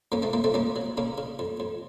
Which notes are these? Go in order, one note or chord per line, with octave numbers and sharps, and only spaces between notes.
F2 A#3 C#4
A3 C4
F2 A#3
A3 C4
F2 A#3 C#4
F#3
C#3 A#3 C#4
C#3
F2
F2